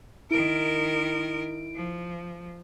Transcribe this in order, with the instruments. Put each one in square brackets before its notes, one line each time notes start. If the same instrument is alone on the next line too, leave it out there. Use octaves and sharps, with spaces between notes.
[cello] D#3 A#4 [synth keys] E4 D7
[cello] F3